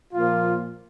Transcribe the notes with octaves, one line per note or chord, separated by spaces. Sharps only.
A#2 F3 A#3 F4